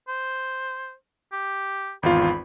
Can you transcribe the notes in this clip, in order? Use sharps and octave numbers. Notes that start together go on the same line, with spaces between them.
C5
G4
G#1 E2 F4 B5